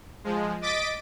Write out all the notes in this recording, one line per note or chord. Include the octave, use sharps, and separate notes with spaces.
F3 G#3
D#5 D6 A6 B6 D7